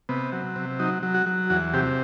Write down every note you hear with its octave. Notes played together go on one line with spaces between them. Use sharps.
C3 B3
F#3
C3
F#3 D#4
F#3
F#4
F#3
E2 F#4
C3 G4